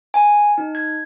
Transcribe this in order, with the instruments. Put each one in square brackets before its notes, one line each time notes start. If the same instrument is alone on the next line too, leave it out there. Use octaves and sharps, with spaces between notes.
[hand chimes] G#5
D#4
G#6